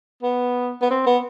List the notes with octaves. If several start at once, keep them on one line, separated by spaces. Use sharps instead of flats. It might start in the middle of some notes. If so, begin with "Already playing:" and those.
B3
B3
C4
B3